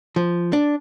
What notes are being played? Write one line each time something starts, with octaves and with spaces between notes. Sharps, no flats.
F3
D4